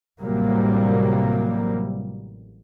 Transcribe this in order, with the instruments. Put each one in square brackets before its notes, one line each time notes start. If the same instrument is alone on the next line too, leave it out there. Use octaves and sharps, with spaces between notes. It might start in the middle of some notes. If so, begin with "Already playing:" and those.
[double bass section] A1 C3 F#3 G3 A#3